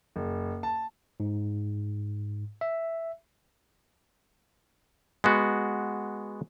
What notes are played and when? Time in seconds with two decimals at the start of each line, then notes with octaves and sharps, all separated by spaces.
0.16 F#1
0.63 A5
1.20 G#2
2.61 E5
5.24 G#3 B3 F#4